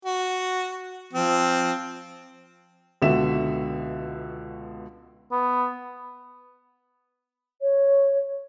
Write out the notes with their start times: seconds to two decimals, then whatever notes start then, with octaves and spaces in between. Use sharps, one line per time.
0.05 F#4
1.13 F3 C4
3.02 C#2 B2 D3 F#4 E5 E7
5.32 B3
7.62 C#5